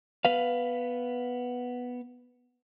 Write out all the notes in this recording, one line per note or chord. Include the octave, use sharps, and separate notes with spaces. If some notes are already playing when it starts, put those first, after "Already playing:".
B3 B4 F5